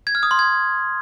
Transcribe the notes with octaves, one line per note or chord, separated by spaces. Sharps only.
G#6
F6
D#6
C6
G#6